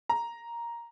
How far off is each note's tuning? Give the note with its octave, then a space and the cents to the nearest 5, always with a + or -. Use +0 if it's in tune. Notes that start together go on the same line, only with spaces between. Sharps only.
A#5 +5